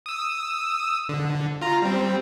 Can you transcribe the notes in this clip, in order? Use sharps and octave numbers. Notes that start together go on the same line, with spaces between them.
D#6 E6
D3
F4 A#5
G3 C4